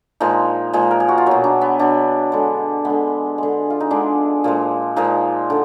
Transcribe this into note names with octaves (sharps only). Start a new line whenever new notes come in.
A#2 F3 G#3 D#4
A#2 F3 G#3
A#4
G#4
F#4
F4
B2 F#3 D#4
D4
B3
B2 F#3 D4
D3 G#3
D3 G#3 B3
D3 G#3
F4
D#4
D3 G#3 D4
A#2 F3 G#3
A#2 F3 G#3 D#4
D3